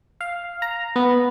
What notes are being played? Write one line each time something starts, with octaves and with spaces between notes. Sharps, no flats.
F5
A#5
B3